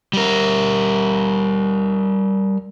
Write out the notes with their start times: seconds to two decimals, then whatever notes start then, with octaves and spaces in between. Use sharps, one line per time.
0.13 G3 A#4